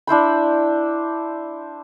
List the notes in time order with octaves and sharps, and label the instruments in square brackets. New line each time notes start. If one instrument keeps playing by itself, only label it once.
[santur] D4 E4 C5 B5